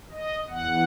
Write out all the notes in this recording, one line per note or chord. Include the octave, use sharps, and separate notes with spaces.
D#5
E2 F#5